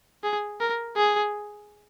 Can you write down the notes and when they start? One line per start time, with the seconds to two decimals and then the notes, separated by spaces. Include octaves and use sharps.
0.24 G#4
0.60 A#4
0.97 G#4